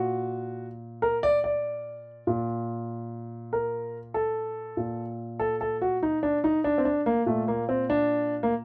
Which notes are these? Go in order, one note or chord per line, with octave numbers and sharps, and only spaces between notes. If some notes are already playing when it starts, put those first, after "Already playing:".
Already playing: A#2 F#4
A#4
D5
D5
A#2
A#4
A4
A#2
A4
A4
F#4
D#4
D4
D#4
D4
C4
D4
A#3
A#2 A3
A#3
C4
D4
A#3